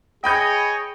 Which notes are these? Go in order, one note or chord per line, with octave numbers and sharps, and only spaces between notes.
G#4 C#5 D#5 G5 B5 G6